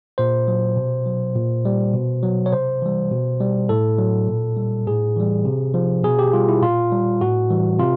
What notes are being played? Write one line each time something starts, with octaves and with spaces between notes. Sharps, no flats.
A#2 C5
F#3
B2
F#3
A#2
G3
B2
F#3
C#5
C3 C5
E3 G3
B2
G3
A2 A4
F#3
A#2
G3
A2 G#4
E3 G3
C3
F3
B2 G#4
G4
G3 F4
E4
A#2 F4
G3
A2 F#4
E3 G3
C3 F4